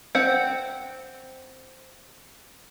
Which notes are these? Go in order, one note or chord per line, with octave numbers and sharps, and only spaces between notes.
C4 F#5